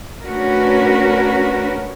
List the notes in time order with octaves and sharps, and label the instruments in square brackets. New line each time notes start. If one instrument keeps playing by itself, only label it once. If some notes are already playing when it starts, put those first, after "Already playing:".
[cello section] A3 C#4 D4 F#4 A#4 B4